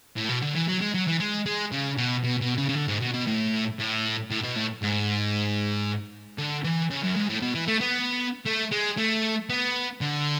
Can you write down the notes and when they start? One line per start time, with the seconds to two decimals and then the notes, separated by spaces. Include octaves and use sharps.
0.16 A2
0.29 B2
0.42 D3
0.55 E3
0.68 F#3
0.81 G#3
0.94 F#3
1.07 E3
1.20 G#3
1.46 G#3
1.72 C#3
1.97 B2
2.24 B2
2.41 B2
2.58 C#3
2.69 C#3
2.75 D3
2.88 G#2
3.01 B2
3.14 B2
3.27 A2
3.79 A2
4.31 A2
4.44 B2
4.56 A2
4.83 G#2
6.38 D3
6.64 E3
6.90 C#3
7.03 F#2
7.16 G#2
7.29 A2
7.42 B2
7.55 E3
7.68 A3
7.81 B3
8.45 A3
8.71 G#3
8.97 A3
9.49 B3
10.01 D3